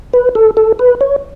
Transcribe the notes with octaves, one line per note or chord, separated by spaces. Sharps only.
B4
A4
A4
B4
C#5